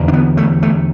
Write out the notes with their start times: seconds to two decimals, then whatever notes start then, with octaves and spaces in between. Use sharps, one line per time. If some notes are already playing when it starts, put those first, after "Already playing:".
Already playing: E2 D3
0.08 D4
0.13 B3
0.37 A3
0.63 A3